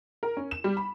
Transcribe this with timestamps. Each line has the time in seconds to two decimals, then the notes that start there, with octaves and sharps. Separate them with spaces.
0.23 A#4
0.37 C#4
0.51 E7
0.64 G3
0.77 B5